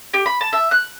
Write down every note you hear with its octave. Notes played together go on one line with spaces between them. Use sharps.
G4
B5
A5
E5
F#6